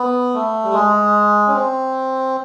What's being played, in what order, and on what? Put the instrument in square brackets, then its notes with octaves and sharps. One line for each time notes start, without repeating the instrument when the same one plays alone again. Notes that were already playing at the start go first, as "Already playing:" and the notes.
Already playing: [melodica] B3
A3
G3
G#3
C#4
C4